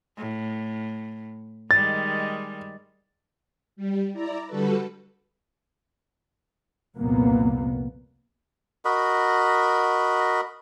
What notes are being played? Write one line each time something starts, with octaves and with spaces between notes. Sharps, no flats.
A2
D#3 G3 G#3 A6
G3
E4 D5 A#5
D3 G3 F#4 A4 B4
C2 F2 A#2 A#3 B3
F#4 A#4 D#5 B5